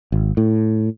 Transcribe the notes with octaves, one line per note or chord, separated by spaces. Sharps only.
G#1
A2